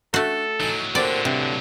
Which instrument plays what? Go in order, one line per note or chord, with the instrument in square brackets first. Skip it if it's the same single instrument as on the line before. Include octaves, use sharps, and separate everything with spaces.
[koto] A3 F#4 [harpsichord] D4 [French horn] A4
[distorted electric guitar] A2 F#3 [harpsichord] D#4 G#5
[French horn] D3 [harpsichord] A#3 C4 G4 [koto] D5
[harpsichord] G2 [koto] C3